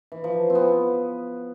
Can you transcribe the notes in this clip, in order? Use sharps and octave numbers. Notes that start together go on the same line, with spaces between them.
E3
F3
C4
B3